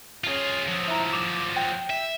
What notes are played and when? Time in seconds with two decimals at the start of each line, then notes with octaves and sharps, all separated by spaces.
0.24 C#4 F4 G#4 C7
0.68 F3 F#3
0.88 E4 A#5
1.13 D6 E7 F7
1.56 G5
1.90 E5